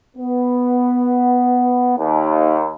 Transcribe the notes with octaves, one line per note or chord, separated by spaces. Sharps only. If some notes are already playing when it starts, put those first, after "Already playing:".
B3
D#2